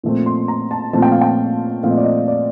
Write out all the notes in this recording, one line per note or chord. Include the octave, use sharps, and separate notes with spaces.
A#2 F3 A3 C4
C6
A#5
A5
A#2 F3 A3 C4 A5
G5
F5
G5
A#2 F3 A3 C4 F5
D#5
D5
D#5
D5